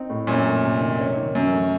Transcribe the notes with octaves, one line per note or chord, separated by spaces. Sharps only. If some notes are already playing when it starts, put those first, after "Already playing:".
Already playing: C4 D#4
A2
F#2 A#2 C#4
A3
C3
D#3
C#4
D#3
F#2 D#3
A3